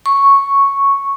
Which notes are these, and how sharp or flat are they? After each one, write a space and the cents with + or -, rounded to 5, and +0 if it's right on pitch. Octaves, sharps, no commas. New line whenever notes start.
C#6 +0